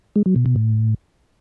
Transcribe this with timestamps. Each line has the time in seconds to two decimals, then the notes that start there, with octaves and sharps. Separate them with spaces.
0.16 G#3
0.26 F#3
0.36 B2
0.46 B2
0.56 A2